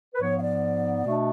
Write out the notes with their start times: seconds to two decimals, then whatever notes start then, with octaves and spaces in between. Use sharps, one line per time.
0.14 B4
0.21 G#2 F3 B3 C#5
0.36 F5
0.41 D5
1.04 B2 A3 D4